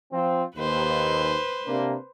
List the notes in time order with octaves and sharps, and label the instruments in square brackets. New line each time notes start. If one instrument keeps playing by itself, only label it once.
[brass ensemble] F3 C4 F4
[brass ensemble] D#2 [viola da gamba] B4 C5
[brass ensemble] C3 A#3 D4